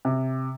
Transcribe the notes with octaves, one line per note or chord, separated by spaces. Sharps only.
C3